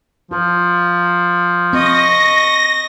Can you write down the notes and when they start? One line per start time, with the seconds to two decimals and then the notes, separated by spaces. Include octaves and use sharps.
0.31 F3 F4 C5
1.73 C4 D#5 C#6 A#6